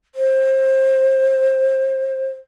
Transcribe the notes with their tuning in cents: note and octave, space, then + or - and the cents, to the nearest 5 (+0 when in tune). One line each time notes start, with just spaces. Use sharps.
C5 +25